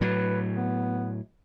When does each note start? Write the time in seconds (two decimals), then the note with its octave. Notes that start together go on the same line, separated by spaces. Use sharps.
0.01 A2 F#3 B4
0.56 B3